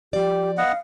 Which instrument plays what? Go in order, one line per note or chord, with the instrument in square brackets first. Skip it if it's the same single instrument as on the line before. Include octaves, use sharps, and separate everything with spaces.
[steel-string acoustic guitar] F3 D5 [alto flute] G4
[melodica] B3 D#5 F#5 [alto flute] F5